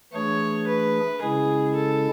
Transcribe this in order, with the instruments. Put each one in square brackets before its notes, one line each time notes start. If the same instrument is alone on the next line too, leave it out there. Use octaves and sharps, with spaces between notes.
[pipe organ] E3 A3 D4 G#4 [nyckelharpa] C#5
[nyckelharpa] B4
[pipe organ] C#3 G#3 C#4 E4 [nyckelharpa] G#4
[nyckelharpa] A4